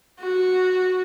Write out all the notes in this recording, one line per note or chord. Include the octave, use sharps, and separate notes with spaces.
F#4